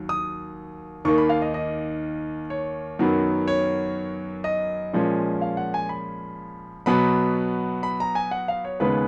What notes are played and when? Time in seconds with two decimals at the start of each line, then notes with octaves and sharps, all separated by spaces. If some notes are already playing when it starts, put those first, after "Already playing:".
Already playing: D#2 F#3
0.09 D#6
1.05 D#2 D#3 A#3 C#6
1.18 B5
1.29 F5
1.42 D#5
1.54 D#5
2.50 C#5
2.99 F#2 D#3 F#3 B3
3.48 C#5
4.44 D#5
4.93 A#2 F3 G#3 C#4
5.42 F5
5.57 F#5
5.74 G#5
5.89 B5
6.86 B2 F#3 B3 B5
7.83 B5
8.00 A#5
8.15 G#5
8.31 F#5
8.48 F5
8.65 C#5
8.80 D#2 C#3 G#3 B3 B4